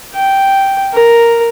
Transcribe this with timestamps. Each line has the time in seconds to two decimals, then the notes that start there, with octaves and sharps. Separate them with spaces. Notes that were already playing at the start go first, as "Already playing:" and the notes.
0.14 G5
0.94 A#4